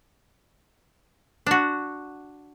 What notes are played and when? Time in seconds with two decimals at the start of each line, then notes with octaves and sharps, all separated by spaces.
1.46 D4 F#4